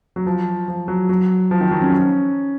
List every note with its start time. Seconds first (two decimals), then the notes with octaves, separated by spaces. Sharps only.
0.16 F#3
0.27 F3
0.68 F3
0.88 F#3
1.09 F#3
1.51 F3
1.61 D#3
1.71 F#3
1.82 C#4